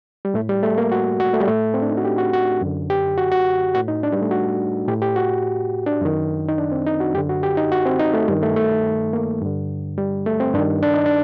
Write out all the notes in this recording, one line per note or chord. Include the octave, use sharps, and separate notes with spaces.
G3
A2 A3
G3
A3
A#3
F#4
F#4
A3
G3
A2 A3
C4
D4
D#4
F#4
G4
F#4
F#4
F#2 D3
G4
F#4
F#4
A2 F#4
D#4
D4
G3
A3
F#4
A2 G4
G4
F#4
D4
F#2 D#3
D#4
D4
C4
D#4
F#4
F#2 D3 G4
F#4
G4
D#4
F#4
C4
D#4
A3
G2 D#3 G3
A3
A3
A#3
G2 D3
G3
A3
C4
G2 D#3 D4
D4
D#4
D4